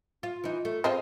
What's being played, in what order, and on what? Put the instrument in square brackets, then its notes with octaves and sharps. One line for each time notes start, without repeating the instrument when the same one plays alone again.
[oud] F4
E3 D#4
A3
[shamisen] F3 G#3 C4 [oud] C5 D#5 F5